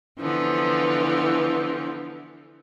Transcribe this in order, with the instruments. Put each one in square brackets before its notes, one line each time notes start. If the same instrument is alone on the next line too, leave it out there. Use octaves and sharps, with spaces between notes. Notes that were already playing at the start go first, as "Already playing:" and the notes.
[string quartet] D3 E3 F3 B3